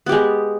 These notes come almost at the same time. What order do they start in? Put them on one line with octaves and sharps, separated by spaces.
B3 G4 G#3